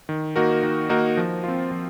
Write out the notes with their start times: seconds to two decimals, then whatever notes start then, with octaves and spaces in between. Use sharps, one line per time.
0.09 D#3
0.36 A#3 D#4 F#4 A#4
0.63 D#3
0.89 A#3 D#4 F#4 A#4
1.17 F3
1.44 C4 F4
1.71 F3